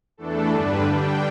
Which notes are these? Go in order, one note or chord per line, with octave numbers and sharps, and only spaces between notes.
E2 E3 A3 D4 A4
G2 D3 G3 D4 B4
D3 G3 D4 G5